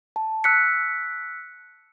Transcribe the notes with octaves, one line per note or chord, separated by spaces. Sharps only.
A5
E6 F#6 B6 C#7